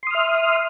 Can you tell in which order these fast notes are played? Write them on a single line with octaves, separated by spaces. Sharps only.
C6 D#6 F6 E5